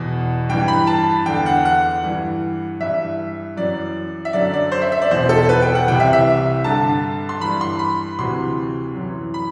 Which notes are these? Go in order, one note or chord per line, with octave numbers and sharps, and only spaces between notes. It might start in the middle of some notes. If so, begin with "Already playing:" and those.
Already playing: E2 B2
G2 E3 G5
B5
A5
E2 D3 G5
F#5
F#5
G2 E3
G2 E3 E5
F#2 E3 D5
E5
F#2 D3 D5
D5
C5
E5
E5
D5
E2 B2 C5
A4
B4
G5
F#5
C2 C3 E3 G5
E5
E5
G2 D3 A5
C6
G2 E3 B5
C6
B5
D2 C3 E3 C6
F#2 E3
B5